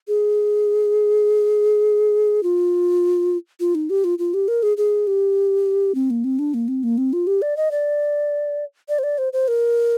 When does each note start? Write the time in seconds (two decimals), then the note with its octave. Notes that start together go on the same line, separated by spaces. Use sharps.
0.08 G#4
2.43 F4
3.60 F4
3.75 D#4
3.90 G4
4.04 F4
4.19 F4
4.34 G4
4.48 A#4
4.63 G#4
4.77 G#4
5.07 G4
5.95 C4
6.10 A#3
6.24 C4
6.39 D4
6.54 A#3
6.68 C4
6.83 A#3
6.98 C4
7.13 F4
7.27 G4
7.42 D5
7.57 D#5
7.71 D5
8.89 D5
8.99 C5
9.03 D5
9.18 C5
9.33 C5
9.48 A#4